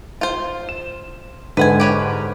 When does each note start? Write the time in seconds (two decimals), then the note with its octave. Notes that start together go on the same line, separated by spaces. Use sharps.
0.21 F4 C5
0.69 E7
1.57 G#2 D3 B4 F#5 G#5
1.80 G4 B4 C#5